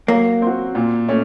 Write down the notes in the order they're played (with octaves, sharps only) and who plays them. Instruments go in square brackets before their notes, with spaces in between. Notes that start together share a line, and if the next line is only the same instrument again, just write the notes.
[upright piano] F#3 [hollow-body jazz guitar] A#3
[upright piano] C4 F#4
A#2
A3 C#4